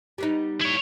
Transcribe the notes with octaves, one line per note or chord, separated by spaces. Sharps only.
G3 B3 D#4
E4 C#5